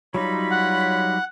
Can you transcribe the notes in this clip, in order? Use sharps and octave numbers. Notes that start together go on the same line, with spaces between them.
F#3 G3 D#4 F4 C#5 B5
F#5